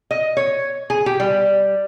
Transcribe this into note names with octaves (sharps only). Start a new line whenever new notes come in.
D#5
C#5
G#4
G4
G3